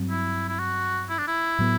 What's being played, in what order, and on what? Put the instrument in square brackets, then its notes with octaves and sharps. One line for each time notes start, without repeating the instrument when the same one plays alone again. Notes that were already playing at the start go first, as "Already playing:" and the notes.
Already playing: [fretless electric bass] G2 F#3 C4
[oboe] E4
E4
F#4
E4
D4
E4
[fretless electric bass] A2 F#3 B3